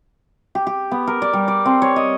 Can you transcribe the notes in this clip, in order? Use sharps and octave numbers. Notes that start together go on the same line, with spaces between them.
G4
G4
B3
A#4
D5
G3
D5
C4
C#5
D#5